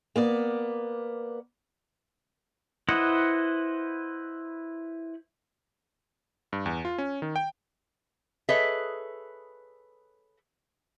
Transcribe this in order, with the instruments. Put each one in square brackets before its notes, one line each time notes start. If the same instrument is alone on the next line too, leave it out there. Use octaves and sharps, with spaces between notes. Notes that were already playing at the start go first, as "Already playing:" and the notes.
[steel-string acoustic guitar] A#3 B3 D5
[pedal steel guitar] E4 B4 C5 D#5 F#5
[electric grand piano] G2
E2
F4
C#4
D#3
G5
[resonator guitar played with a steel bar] G#4 A4 B4 C#5 D#5 E5